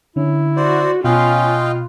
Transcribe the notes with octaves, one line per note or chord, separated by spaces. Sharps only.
D3 C#4 E4
F#4 C5 D5
B2 C#4 F4 D#5 F5 G5 B5 F#6